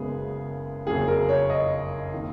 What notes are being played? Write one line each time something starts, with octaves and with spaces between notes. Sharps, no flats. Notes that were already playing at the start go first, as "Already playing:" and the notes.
Already playing: F#1 F#2 C#3 G#3 B3 G#4
F#1 F2 C#3 F#3 A#3 G#4
A#4
C#5
D#5
D#3 A#3